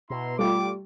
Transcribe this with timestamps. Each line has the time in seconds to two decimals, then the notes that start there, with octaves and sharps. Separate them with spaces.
0.10 B2 E4 A#5 C6
0.39 G3 A3 F4 D6